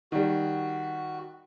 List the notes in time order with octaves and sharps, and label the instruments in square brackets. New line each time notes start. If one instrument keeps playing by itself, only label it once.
[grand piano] D#3 G3 [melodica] F#4